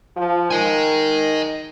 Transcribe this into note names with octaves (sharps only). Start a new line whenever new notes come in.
F3
D#3 D#5 G#5